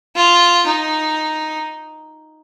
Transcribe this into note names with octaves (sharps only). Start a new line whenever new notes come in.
F4
D#4